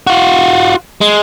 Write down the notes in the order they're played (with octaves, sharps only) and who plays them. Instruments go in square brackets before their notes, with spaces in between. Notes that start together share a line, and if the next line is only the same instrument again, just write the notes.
[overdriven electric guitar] F4 F#4
G#3